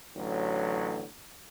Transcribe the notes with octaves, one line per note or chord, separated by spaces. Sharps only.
A1 D3 F#3